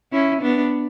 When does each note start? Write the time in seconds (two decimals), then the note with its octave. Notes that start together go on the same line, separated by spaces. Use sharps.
0.12 C#4 E4
0.41 B3 D4